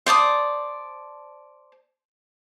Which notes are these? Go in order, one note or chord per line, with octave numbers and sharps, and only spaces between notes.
C5 D5 A5 D#6